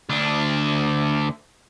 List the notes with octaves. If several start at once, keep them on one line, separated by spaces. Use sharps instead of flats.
D2 D4